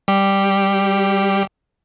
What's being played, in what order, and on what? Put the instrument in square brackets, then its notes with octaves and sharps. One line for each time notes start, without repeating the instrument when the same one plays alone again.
[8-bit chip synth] G3 G4